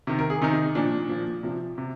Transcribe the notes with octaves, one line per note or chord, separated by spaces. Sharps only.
C3 D#3
A#4
G#4
C3 D#3 D#4
A#2 F3 D4
A#2 F3
C3 F3
C3